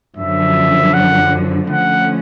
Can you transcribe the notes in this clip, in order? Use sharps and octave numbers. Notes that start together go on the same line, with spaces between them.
F#2 D3 F3 E5
F#5
D3 F3 A3 C#4 F#5